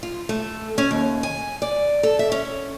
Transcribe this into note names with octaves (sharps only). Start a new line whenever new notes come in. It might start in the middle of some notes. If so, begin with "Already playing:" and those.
F4
A3
C#4
D#2
G#5
D5
A4
E5
C#4